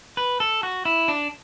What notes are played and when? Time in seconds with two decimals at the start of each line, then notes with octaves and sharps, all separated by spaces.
0.17 B4
0.40 A4
0.63 F#4
0.85 E4
1.08 D4